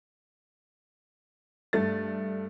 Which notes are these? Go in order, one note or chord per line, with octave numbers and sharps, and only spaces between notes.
G2 A3 A6